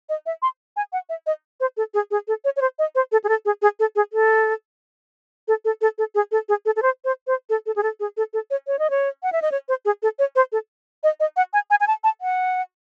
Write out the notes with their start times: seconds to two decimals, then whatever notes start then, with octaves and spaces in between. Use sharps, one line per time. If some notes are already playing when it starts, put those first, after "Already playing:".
0.09 D#5
0.26 E5
0.42 C6
0.76 G#5
0.93 F#5
1.09 E5
1.27 D#5
1.60 C5
1.77 A4
1.94 G#4
2.11 G#4
2.28 A4
2.45 C#5
2.56 C#5
2.61 C5
2.79 D#5
2.95 C5
3.12 A4
3.24 G#4
3.29 A4
3.45 G#4
3.62 G#4
3.80 A4
3.96 G#4
4.13 A4
5.48 A4
5.65 A4
5.81 A4
5.98 A4
6.15 G#4
6.32 A4
6.49 G#4
6.66 A4
6.76 A4
6.82 C5
7.05 C5
7.27 C5
7.50 A4
7.66 A4
7.76 G#4
7.83 A4
8.00 G#4
8.17 A4
8.33 A4
8.50 C#5
8.67 C#5
8.79 D#5
8.90 C#5
9.23 F#5
9.32 E5
9.42 D#5
9.52 C#5
9.69 C5
9.85 G#4
10.03 A4
10.19 C#5
10.36 C5
10.52 A4
11.03 D#5
11.20 D#5
11.37 F#5
11.53 G#5
11.70 G#5
11.81 G#5
11.87 A5
12.04 A5
12.21 F#5